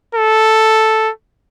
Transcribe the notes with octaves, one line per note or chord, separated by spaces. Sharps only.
A4